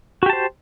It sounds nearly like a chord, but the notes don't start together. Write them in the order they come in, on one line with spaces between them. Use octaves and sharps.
F#4 G4 A5 C5